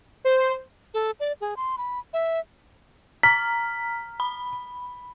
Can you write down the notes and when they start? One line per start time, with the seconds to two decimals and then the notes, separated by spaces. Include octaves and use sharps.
0.24 C5
0.94 A4
1.20 D5
1.41 G#4
1.57 C6
1.78 B5
2.13 E5
3.23 A#5 F6 B6
4.20 B5